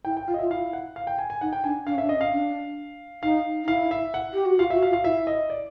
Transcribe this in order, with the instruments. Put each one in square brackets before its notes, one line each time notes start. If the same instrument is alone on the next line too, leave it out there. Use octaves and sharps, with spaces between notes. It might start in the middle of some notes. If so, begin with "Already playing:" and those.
[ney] E4 [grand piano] G5
[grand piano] G5
[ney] F4 [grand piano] F5
[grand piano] D#5
[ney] F4 [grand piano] E5
[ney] E4 [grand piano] F5
[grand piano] F#5
F5
G5
G#5
G#5
[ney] D#4 [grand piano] F#5
[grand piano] G5
[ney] D4 [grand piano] G#5
[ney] D4 [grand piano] F5
[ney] C#4
[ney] D4 [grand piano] E5
[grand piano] D#5
[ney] C#4
[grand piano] F5
[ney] D4
[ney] D#4 [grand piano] F5
[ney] D#4
[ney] E4 [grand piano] F5
[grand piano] E5
F#5
[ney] G4
F#4
[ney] F4 [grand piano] F5
[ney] F#4 [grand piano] E5
[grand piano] F5
[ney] F4
[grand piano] F5
[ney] E4 [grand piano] E5
[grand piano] D#5
D5